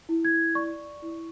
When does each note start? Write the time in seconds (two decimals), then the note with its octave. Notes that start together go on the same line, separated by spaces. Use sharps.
0.09 E4
0.25 G#6
0.55 D5 C#6
1.02 E4